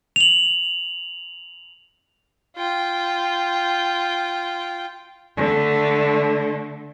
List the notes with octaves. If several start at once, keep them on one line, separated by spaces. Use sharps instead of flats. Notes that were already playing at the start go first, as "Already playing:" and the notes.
F7 F#7
F4 G5
D3 A3